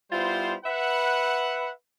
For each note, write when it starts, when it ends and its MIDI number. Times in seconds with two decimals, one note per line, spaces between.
0.11 0.54 55
0.11 0.54 59
0.11 0.54 64
0.11 0.54 65
0.11 0.54 72
0.65 1.69 71
0.65 1.69 76
0.65 1.69 78